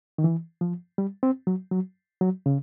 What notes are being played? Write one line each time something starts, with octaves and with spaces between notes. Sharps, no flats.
D#3
E3
F3
G3
C4
F#3
F#3
F#3
C#3